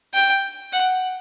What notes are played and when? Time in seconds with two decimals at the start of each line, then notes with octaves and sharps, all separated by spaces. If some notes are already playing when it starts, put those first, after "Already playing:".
0.14 G5
0.73 F#5